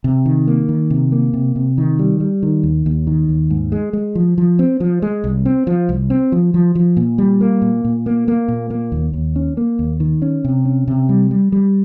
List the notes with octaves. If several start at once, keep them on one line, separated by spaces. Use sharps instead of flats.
C3
D#3
A#3
D#3
C3
A#3
C3
C3
D#3
G3
G3
D#3
D#2
D#2
D#3
D#2
G#2
G#3
G#3
F3
F3
C4
F3
G#3
C2
C4
F3
C2
C4
F3
F3
F3
A#2
G3
A#3
A#2
A#2
A#3
A#3
A#2
A#3
D#2
D#2
C#4
A#3
D#2
D#3
C#4
C3
C#4
C3
G3
G3
G3